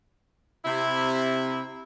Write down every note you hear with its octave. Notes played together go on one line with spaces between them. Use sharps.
C3 E4